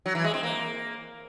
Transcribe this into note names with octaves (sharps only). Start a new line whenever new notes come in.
F#3
E3
G#3
C4
A#3